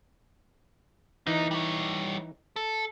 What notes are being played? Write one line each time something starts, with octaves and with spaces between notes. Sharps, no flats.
E3 A#3 D#4 D#5
G3 C#5
A4